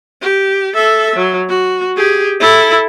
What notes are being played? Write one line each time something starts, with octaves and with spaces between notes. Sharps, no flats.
G4
A4 E5
F#3
F#4
G4 G#4
E4 A4